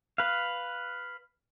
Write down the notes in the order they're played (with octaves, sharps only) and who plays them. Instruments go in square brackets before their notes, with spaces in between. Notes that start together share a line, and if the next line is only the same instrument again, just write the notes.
[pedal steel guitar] B4 F5